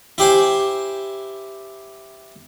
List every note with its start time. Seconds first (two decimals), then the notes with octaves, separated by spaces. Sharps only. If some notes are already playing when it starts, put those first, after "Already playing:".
0.18 E4 G4 C5 G#5